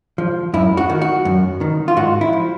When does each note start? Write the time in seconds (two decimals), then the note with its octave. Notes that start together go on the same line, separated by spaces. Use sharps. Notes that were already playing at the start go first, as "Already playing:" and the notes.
0.18 F3
0.54 F#2 E4
0.77 F#4
0.90 D#3
1.02 F#4
1.25 F#2
1.61 D#3
1.88 F4
1.96 G#2 F#4
2.21 E4
2.33 F3